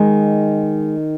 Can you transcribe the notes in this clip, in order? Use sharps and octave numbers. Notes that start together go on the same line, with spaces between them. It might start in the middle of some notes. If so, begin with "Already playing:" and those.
Already playing: D#3 G#3